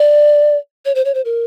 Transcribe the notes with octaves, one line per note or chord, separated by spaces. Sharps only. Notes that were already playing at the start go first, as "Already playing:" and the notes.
Already playing: D5
C#5
C5
C#5
C5
A#4